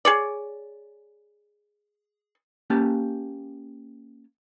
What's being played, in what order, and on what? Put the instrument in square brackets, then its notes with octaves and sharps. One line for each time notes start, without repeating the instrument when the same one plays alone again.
[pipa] G#4 C#5 D5
[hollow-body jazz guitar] A#3 C#4 G4 A5